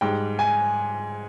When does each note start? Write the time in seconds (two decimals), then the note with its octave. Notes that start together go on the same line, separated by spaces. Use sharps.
0.01 G#2 G3 G5
0.39 G#5